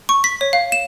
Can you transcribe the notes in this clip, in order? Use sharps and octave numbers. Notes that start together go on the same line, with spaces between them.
C#6
B6
C#5
F5
E7